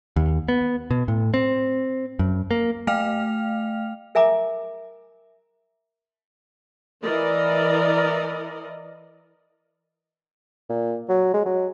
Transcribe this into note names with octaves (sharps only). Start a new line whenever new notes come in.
D#2
B3
B2
A2
C4
F#2
A#3
A3 F5 G5 F6 F7
A#4 E5 G#5 A#5 D6
E3 A#4 D5 D#5
A#2
F#3
G#3
F#3